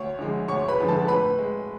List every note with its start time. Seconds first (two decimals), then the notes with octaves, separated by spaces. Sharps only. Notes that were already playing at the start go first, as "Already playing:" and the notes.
Already playing: D2 C#5 C#6
0.19 D3 F3 G#3
0.48 D2 C#5 C#6
0.68 B4 B5
0.78 D3 F3 G#3
0.88 A4 A5
1.08 A2 B4 B5
1.38 G#3